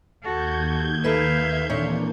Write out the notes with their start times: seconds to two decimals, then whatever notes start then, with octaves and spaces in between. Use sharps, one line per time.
0.23 D#2 F#4 A4 G6 G#6
1.04 A#3 A4 B4 E5 F5
1.70 A#2 E3 A#3 C4 D4 C#5